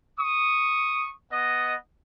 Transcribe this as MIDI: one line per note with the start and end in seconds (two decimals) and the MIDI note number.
0.18 1.10 85
0.18 1.10 87
1.31 1.74 59
1.31 1.74 75